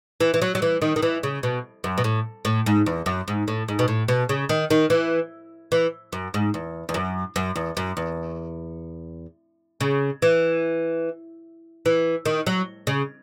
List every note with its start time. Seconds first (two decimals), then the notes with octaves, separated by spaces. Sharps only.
0.20 E3
0.34 E3
0.42 F#3
0.55 F#3
0.62 E3
0.82 D#3
0.96 D#3
1.02 E3
1.23 C#3
1.43 B2
1.84 F#2
1.98 B2
2.04 A2
2.45 A2
2.66 G#2
2.86 E2
3.06 F#2
3.28 G#2
3.48 A2
3.68 G#2
3.79 B2
3.88 A2
4.08 B2
4.29 C#3
4.49 D#3
4.70 D#3
4.90 E3
5.72 E3
6.13 F#2
6.34 G#2
6.54 E2
6.89 E2
6.94 F#2
7.36 F#2
7.56 E2
7.77 F#2
7.97 E2
9.81 C#3
10.22 E3
11.86 E3
12.25 D#3
12.47 F#3
12.87 C#3